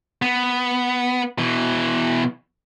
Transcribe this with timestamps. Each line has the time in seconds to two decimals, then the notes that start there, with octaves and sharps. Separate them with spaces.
0.22 B3
1.38 B2 E3